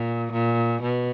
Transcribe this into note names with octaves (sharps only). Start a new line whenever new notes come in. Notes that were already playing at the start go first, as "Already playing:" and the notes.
Already playing: A#2
A#2
B2